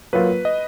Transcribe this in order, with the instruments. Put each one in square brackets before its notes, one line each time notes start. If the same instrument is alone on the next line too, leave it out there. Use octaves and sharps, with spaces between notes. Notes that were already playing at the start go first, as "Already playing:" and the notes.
[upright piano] F#3 A#3 F4 [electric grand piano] B4
[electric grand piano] D#5